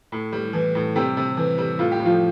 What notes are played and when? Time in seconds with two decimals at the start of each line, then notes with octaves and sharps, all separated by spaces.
0.12 A2
0.33 G3
0.53 E3
0.75 A2
0.96 C3 G3 G4
1.17 C3
1.37 E3
1.58 G3
1.79 A2 F4
1.92 G4
2.00 A2
2.05 F3 F4